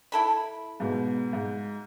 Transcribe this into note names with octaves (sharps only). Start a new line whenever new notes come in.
E4 A4 B5
G#2 B2
G#2